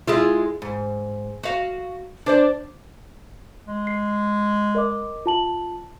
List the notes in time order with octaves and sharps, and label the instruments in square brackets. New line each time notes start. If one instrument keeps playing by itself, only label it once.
[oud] G#3 E4 F4
G#2
F#4 F5
D4 C5 D5
[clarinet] G#3
[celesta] C7
A#4 D#5 D6
F4 A5 F#7